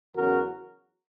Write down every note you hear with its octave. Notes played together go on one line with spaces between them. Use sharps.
E2 C#3 F#3 F#4 A#4